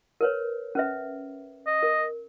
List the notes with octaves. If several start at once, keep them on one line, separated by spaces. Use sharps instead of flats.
A#4 B4 C#5
C#4 B4 E5
D#5
A#4